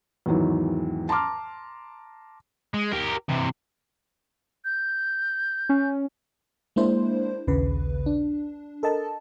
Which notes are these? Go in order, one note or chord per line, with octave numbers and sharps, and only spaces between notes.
E2 G#2 D#3 E3 F#3
A5 A#5 C6 D6 F6
G#3
G4 A#4
C3 E3
G6
C#4
G#3 A#3 D4 E4 C5
A#1 D#2 C#3 B4
D4
A4 A#4 D#5 A5